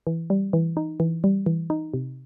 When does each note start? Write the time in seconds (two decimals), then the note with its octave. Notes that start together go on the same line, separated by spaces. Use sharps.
0.07 E3
0.30 G3
0.53 E3
0.77 D#4
1.00 E3
1.24 G3
1.46 E3
1.70 D#4
1.94 C3